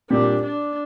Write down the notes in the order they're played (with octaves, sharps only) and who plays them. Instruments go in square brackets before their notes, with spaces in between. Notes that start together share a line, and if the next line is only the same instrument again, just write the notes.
[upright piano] A#2 G3 C4 G4 [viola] D4
[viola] D4